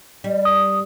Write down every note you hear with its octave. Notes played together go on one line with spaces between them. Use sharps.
G3
D#6